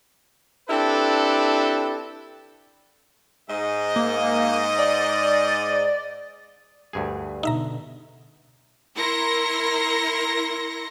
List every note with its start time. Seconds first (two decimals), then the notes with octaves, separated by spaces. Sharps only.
0.69 C4 D4 E4 G4 A4 B4
3.50 G#2 D#5
3.96 A#3
4.79 D5
6.93 D2 G2 G#4
7.43 B2 D3 D#4 E5 A#5
8.95 E4 A#4 C6 A#6 C#7